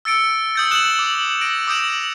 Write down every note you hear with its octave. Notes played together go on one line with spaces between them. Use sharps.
E6 A6 C#7 D7
D#6 G6 A6
D#6 F#6 E7 F#7
D6
A#6 D7
D6 D#6 G6 D7 E7